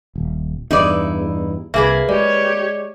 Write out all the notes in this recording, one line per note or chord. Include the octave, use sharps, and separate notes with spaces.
D#1
E2 G2 D#4 E4 D5
C2 A#3 G#4 B4 E5
G#3 G4 C#5 D5